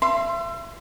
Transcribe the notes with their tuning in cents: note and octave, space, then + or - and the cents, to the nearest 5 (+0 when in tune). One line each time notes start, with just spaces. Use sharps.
E5 +40 C6 +0